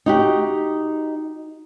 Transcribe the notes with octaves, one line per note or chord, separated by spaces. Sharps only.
D#4 F#4 G4